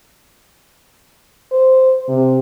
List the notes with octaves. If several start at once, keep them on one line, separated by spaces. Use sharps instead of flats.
C5
C3